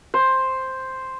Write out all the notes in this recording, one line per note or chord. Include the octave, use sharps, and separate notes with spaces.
C5